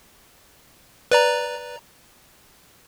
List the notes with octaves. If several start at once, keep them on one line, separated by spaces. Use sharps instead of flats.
B4 D5 A#5